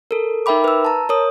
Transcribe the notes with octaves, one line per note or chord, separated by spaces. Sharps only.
A4 A#4
D#4 A#4 E5 G5 B5 D6
B4 E6
A5 A#5
A#4 C#5 D#6